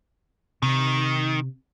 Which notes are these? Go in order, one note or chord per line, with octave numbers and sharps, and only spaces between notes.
C3 D#3